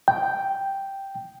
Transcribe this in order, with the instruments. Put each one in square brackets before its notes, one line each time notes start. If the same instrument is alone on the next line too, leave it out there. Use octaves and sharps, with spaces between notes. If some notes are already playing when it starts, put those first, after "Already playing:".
[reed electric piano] G5